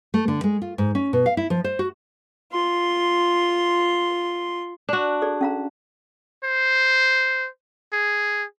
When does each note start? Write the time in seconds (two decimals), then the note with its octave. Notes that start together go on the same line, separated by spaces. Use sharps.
0.14 A3
0.28 D3
0.44 G#3
0.62 F4
0.78 G#2
0.95 C#4
1.13 B2
1.26 F5
1.37 E4
1.50 F3
1.64 C5
1.79 F#4
2.52 F4 C6
4.89 D4 F#4
5.22 G#4 A4 D5
5.41 C#4 F5 A#5
6.44 C5
7.93 G#4